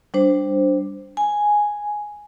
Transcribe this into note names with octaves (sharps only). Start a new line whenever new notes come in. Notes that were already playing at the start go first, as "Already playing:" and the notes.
G3 D4 C5
G#5